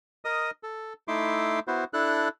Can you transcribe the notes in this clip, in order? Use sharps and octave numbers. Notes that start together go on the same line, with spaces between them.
A#4 D#5 D#6
A4
A3 D#4 E4 E5 C6 D6
B3 E4 F#4 C5
D4 E4 A4 F#6